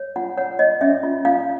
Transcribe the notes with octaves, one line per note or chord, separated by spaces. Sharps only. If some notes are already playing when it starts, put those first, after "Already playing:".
Already playing: C#5
F4 F#5
C#5 F#5
C#5 D#5
C#4 E5
F4
F4 F5